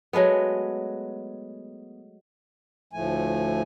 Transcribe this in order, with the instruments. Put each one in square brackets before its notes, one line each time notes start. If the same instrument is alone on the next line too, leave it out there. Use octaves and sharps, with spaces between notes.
[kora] F#3 G#3 A3 B3
[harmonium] D2 A2 F3 A3 G#5